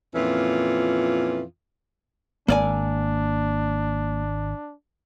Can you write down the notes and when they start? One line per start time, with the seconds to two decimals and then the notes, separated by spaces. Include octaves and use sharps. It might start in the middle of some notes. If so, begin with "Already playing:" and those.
0.15 F2 A#2 E3 C#4 F4
2.48 G#1 A#3 D4 D5 G#5